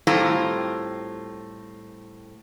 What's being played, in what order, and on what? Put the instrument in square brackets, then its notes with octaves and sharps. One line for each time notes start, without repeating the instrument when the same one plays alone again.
[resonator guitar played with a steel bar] A2 G3 C4 F4 A4 A#5